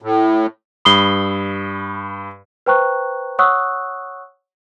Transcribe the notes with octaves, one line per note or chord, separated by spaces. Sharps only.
A2
G2 B5 D#6 C7 G7
B4 C5 G5 A#5 C#6 F#6
C#5 F#5 C#6 D#6 E6 F#6